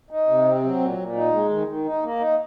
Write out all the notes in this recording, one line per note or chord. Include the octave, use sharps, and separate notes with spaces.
D#4
C3
C4
F#3
A#2
A#2
D#4
G#3
D#3
D#3
D#4
A#3
D#4